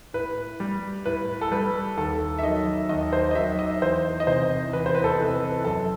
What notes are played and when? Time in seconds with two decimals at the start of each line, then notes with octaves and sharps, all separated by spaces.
0.14 A2 B4
0.60 G3
1.06 A2 B4
1.41 A4
1.52 G3 B4
1.97 D#2 A4
2.38 E5
2.43 D#3 F#3 D#5
2.89 D#2 D#5
3.13 C5
3.31 D#5
3.35 D#3 F#3 E5
3.59 D#5
3.81 E2 C5
4.20 D#5
4.27 C3 E3 C5
4.73 E2 B4
4.86 C5
4.95 B4
5.04 A4
5.19 C3 E3
5.34 B4
5.65 F#2 A4